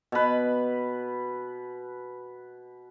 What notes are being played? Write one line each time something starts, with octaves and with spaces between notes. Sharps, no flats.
B2 B4